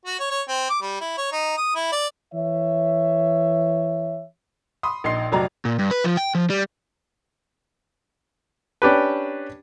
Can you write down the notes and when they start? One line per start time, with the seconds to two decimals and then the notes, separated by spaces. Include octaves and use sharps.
0.06 F#4
0.19 C#5
0.31 C#5
0.48 C4
0.70 D6
0.82 G3
1.01 E4
1.17 C#5
1.32 D#4
1.57 D#6
1.75 E4
1.92 D5
2.33 E3 C#5 E5
4.83 B5 C6 D#6
5.04 A#1 D#4 C6 C7
5.32 F1 F2 F#3 D5 D#5 A#5
5.65 A#2
5.79 G2
5.91 B4
6.04 F3
6.17 G5
6.35 F3
6.50 G3
8.82 C#4 D4 G4 B4